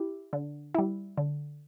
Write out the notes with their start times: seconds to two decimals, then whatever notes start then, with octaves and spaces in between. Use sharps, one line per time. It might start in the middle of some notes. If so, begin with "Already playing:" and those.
Already playing: E4 G4
0.33 D3
0.75 G3 E4
1.18 D3